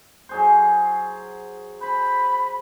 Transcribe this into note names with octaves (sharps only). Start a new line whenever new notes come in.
F#3 G#4 C5
C5 B5